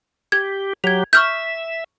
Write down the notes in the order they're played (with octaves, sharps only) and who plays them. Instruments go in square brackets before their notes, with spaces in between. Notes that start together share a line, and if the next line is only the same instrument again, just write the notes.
[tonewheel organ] G4 [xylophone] G#6
[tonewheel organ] F#3 G4 [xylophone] G#6 F7
[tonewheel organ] E5 [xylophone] C#6 F6 G6